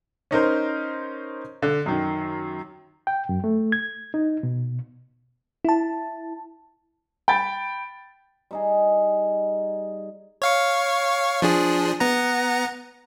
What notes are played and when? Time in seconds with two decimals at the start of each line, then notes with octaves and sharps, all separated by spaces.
0.31 C#4 D#4 A#4 C5
1.62 D3
1.86 F#2 D#3
3.07 G5
3.29 F#2
3.44 A3
3.72 G#6
4.14 D#4
4.43 B2
5.65 E4 A5
7.28 G5 B5 A6
8.51 G3 D#4 G#4
10.42 C#5 F5 C#6
11.42 F3 D4 G#4
12.00 B3 F#5 A#5